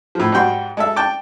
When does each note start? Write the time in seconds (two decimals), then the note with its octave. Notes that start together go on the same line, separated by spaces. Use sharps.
0.15 A2 F3
0.32 G#2 G3 F#4 G5 C6
0.77 G#3 A4 E5
0.96 G5 A5 D6